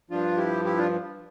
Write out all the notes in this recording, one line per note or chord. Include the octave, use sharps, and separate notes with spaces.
G2 F3 D4 F4
E4 G4
E4 G4
D4 F4